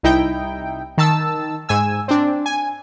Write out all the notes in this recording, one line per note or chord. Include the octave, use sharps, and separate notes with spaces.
C2 D#4 E4 G5
D#3 A5 E6
G#2 G#5 E6
C4 D4
G#5